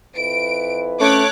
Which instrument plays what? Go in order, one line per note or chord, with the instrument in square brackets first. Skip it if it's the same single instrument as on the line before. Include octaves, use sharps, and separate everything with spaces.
[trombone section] F2 E4 B4 [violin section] D7
[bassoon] A3 [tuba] C#4 [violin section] C#5 D6 F#6